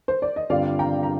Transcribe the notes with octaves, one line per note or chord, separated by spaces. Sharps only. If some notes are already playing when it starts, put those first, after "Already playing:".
C5
D5
D#5
G2 D3 G3 C4 F4 D5 F5
G5 A#5
A#5